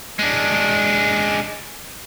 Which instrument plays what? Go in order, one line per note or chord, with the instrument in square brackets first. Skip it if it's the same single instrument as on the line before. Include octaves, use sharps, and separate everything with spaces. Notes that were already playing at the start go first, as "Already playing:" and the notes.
[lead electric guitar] G#3 D4